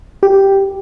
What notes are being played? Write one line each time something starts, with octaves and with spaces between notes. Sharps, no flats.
G4